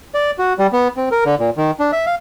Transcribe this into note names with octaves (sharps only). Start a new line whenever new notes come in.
D5
F#4
G3
B3
C4
A#4
D3
A#2
D#3
D4
E5
F5